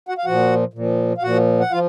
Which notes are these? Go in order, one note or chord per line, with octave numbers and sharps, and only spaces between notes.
F#4 F#5
F5
A#2 F3 F#4 F#5
A#2 F3
F5
A#2 F3 F#4 F#5
F#5
F3 F4 F5